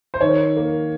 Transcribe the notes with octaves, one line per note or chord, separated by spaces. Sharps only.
C5
D#3 C#5
A#3